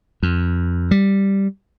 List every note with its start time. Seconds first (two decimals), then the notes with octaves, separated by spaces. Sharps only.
0.23 F2
0.91 G3